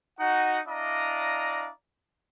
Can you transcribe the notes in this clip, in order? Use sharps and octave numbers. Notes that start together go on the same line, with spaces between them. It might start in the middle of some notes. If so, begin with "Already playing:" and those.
D#4 F#4 F#5
D4 E4 D5 D#5 F5 A#5